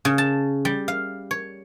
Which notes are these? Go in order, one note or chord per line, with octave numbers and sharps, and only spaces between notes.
C#3
A5
G3
F5
C#5